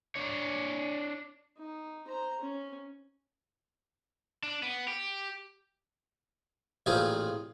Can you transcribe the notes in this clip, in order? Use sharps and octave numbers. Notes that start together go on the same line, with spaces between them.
D4 C#5
D#4
C5 A#5
C#4
D4
B3
G4
A1 A#2 C4 F4 G#4 C5